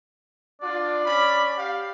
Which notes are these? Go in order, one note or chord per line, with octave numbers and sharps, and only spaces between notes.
D4 F4 D5
C#4 B5
G4 F5